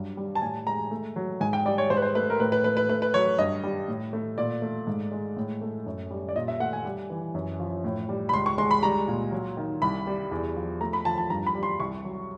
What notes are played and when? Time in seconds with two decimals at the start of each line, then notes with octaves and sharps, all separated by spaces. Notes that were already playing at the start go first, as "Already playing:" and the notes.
Already playing: G2 F#3
0.17 G3
0.35 A5
0.42 A2 G#5
0.67 G#3 A#5
0.91 A3
1.16 F#3
1.41 G#2 G#5
1.53 G5
1.65 G3 D5
1.78 C#5
1.90 G#2 C5
1.97 B4
2.02 C5
2.15 A3 B4
2.30 A#4
2.40 A2 B4
2.52 B4
2.64 A3 B4
2.77 B4
2.89 A3 B4
3.02 B4
3.14 F#3 C#5
3.38 G2 D#5
3.64 G3
3.88 A2
4.13 A3
4.38 A#2 D5
4.62 A3
4.87 G#2
5.12 G#3
5.37 A2
5.61 A3
5.86 F#2
6.11 G3
6.29 D5
6.36 A#2 D#5
6.48 E5
6.60 A3 F#5
6.73 G#5
6.85 G3
7.10 E3
7.35 F#2
7.60 F3
7.84 A2
8.09 G3
8.29 B5
8.33 C#2 C6
8.46 C#6
8.58 G#3 C6
8.71 B5
8.83 G3 A#5
9.08 A#2
9.32 F#3
9.57 D#3
9.82 C2 B5
10.07 G3
10.31 E2
10.56 F3
10.81 A3 A#5
10.93 B5
11.05 F3 A5
11.18 A5
11.30 G2 A#5
11.46 B5
11.55 G3
11.63 C6
11.80 C2 C#6
12.05 F#3